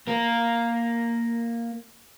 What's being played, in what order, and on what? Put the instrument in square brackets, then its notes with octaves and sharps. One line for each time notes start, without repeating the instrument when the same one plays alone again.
[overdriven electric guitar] A#3 A#4